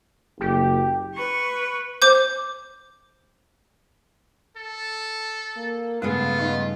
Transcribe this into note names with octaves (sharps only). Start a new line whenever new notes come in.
F#1 G4
B4 C#6
C5 D6 G6
A4
A#3
G2 C#3 G#3 A3 B3 F4
G3 D#4 D#5